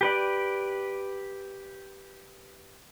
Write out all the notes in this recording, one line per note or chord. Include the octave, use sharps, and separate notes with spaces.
G4 B4 D5